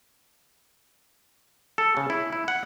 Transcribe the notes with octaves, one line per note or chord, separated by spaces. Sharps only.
A4
C#3
E4
E4
F#5